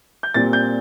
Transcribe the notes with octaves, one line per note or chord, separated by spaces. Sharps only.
G6
A#2 G3 C4 A6
G6